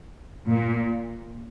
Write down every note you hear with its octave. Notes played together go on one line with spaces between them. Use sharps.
A#2